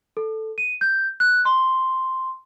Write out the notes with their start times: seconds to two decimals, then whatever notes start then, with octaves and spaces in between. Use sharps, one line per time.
0.17 A4
0.58 D#7
0.81 G6
1.20 F#6
1.45 C6